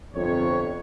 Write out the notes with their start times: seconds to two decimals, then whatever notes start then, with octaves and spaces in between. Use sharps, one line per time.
0.14 G1 F2 C3 C#5